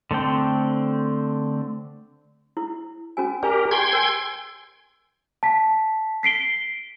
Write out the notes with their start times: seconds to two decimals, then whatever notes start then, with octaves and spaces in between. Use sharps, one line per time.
0.11 D3 A3 C4 G5
2.57 E4
3.17 C#4 F#4 G#5
3.43 G4 A#4 D5 G#5 A#5
3.71 G4 G5 G#5 C6 G#6
3.93 A#4 G#5
5.43 A5 B6
6.23 B6 C7 D7 G7